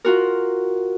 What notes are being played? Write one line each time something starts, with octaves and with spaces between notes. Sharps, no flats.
F4 F#4 A#4